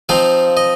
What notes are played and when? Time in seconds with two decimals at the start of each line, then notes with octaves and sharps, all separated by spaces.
0.09 F3 C4 D#4 F5
0.57 D#5